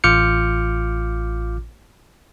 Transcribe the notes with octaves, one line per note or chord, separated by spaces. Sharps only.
A1 F4 D6 F6 G6 C#7